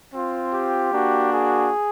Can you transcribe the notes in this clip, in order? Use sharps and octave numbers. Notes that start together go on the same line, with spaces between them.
C4 F4
G4
A#3 D4 F#4
G#4